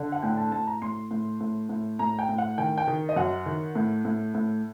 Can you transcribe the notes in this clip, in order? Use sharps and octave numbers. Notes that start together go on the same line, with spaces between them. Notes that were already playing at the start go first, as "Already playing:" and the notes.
Already playing: D3
F#5
A2 G5
A5
A2 A5
A#5
A2 C6
A2
A2
A2
A2 A#5
G5
A2
F#5
D#3 G5
G5
D#3
D#5
F#2 F#5
D#3
A2
A2
A2